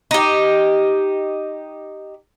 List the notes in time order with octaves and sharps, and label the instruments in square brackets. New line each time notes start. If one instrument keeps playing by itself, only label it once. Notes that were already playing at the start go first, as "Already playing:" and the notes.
[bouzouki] D#4 G4